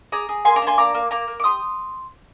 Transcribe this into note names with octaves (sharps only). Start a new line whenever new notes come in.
G#4 A#5 D6
G#4
A#3 G#5 C6
A#5 D6
D4
G#5 C6
A#3 A#5 D6
A#3
A#3 A#5 D6
A#3
D6
G4 C6 D#6